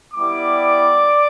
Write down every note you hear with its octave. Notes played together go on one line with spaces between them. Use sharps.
G3 B3 E4 G4 D5 D6